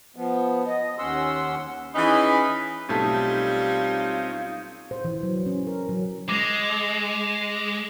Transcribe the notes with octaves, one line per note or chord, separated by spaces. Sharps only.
F3 B3
D#5
D#2 C#4 F#5 C6 E6
E3 C#4 D#4 G#4 B4 B5
B1 G3 A3 C4 C#4 D#4 F4
C5
E3
F#3
C#4
A#4
F#3
G#3 D6 A#6 F7